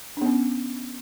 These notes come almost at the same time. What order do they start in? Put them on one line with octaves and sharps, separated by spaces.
D4 B3 C#4